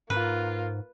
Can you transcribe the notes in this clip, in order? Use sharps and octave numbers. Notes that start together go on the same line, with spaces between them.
G#2 A#3 F4 B4